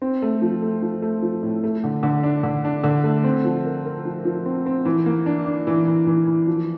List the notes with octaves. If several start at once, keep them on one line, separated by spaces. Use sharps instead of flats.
C4
A3
F3
A3
F3
A3
F3
A2
A3
D3
D3
D4
D3
D4
D3
A3
C4
F3
A#4
A#4
F3
F3
C4
C4
E3
A#3
D4
D4
E3
E3
E3
E3
F3